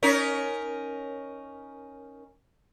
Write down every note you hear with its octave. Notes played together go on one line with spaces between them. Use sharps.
C#4 D#4 A#4